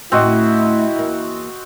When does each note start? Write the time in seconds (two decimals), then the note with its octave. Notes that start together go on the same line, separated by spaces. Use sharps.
0.12 D2 A2 C4 C#4 E4 F#4 D#5
0.95 E2 A#3